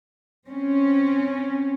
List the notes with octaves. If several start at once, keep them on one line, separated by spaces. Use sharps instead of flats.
C4 C#4